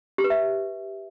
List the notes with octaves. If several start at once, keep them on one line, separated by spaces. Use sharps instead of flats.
G4
B4
E5